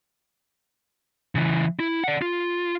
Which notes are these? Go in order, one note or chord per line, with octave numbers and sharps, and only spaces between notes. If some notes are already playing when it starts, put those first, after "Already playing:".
C#3 E3
E4
D5 F#5
F4